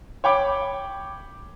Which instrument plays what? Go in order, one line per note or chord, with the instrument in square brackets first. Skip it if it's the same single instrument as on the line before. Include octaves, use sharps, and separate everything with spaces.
[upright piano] C#5 G5 B5 D6